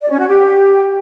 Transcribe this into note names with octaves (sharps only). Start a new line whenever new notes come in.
D5
C#4
F#4
G4